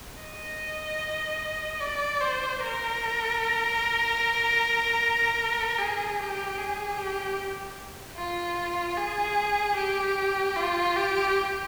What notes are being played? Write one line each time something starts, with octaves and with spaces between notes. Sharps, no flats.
D#5
D5
C5
A#4
G#4
G4
G#4
G4
F4
G#4
G4
F4
G4